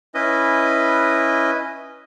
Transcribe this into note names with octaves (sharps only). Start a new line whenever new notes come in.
C#4 E4 B4 D#5